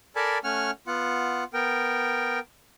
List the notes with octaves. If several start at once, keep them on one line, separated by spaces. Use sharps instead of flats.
A4 A#4 D5 G#5 A5 B5
A3 C#4 F#5 G#5 F6
B3 F4 F#5
B3 A#4 G5